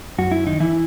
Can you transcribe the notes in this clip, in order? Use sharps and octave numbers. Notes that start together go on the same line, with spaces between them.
F#2 F#4
E4
D#3 D#4
E3 E4